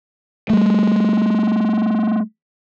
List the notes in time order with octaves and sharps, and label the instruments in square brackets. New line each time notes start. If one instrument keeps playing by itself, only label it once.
[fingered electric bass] G3 A3